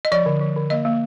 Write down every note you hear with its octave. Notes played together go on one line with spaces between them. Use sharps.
D#5
F3 D5
D3
F3
D3
A#3 D#5
A#3